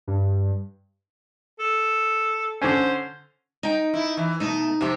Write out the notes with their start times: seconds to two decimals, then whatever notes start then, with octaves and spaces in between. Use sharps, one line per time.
0.08 G2
1.59 A4
2.62 D3 C#4 C5
3.63 D#4 G5
3.94 E4
4.17 E3
4.40 B2 A3 D#4
4.81 F2 C3 G4